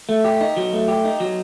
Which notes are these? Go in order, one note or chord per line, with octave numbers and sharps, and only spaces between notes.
A3
G4
D#4
F#3
A3
G4
D#4
F#3